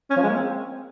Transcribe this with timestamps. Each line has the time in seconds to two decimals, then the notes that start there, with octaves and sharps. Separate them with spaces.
0.11 C#4
0.17 F3
0.23 G#3
0.29 A#3
0.35 C4